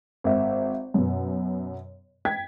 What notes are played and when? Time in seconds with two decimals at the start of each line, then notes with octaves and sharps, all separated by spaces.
0.24 G#1 E5
0.94 F#2 B2
2.25 G5 G#6 B6